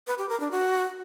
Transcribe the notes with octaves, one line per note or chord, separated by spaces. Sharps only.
B4
G4
A#4
D4
F#4